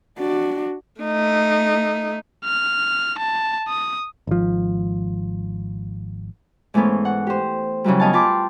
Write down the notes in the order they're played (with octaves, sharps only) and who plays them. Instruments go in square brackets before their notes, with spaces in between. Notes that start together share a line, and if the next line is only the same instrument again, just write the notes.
[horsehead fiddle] D4 F#4
[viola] A3 D#4
[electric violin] F6
A5
D#6
[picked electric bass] G#1 F3
[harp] G#2 E3 A3 B3 C#4
F#5
G4 C5
C#3 E3 F#3 G3
B3 D#5 F5 G#5 A5
F4 G5 A5 B5 C6 D6